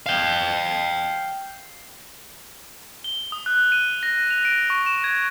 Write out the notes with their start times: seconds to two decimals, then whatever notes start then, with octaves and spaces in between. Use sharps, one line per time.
0.06 F5 G5
3.04 G7
3.32 D#6
3.46 F#6
3.72 D#7
4.03 A#6
4.31 F7
4.45 D7
4.70 C#6
4.86 E7
5.04 G#6